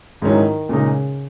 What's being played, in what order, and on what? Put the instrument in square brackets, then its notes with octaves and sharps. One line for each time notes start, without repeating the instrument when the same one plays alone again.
[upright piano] G#2 F#3 C#4 E4 [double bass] D#3
[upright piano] A#2 G#3 D#4 [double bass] C#3